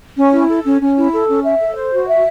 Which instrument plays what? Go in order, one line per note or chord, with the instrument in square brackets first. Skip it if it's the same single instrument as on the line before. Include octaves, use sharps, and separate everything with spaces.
[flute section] C#4
E4
A4
C#4
C#4
E4
A4
C#4
E5
A4
C5
F#4
E5